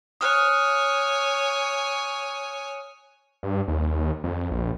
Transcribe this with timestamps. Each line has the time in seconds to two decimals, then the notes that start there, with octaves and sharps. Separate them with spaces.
0.21 C#5 G#5 D#6 F6 F#6
3.43 G2
3.68 D#2
4.24 F2
4.51 A#1